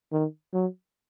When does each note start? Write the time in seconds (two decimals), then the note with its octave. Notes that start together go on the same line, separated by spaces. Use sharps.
0.12 D#3
0.54 F#3